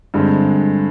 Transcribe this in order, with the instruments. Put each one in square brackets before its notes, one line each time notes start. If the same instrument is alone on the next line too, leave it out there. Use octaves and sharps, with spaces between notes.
[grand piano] G2 D3 G#3 C4